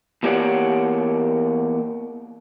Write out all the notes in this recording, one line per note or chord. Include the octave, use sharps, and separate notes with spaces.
E2 A#3 G4 C#5 D5 F#5